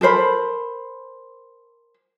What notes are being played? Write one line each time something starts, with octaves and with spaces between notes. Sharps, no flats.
A4 A#4 C5 B5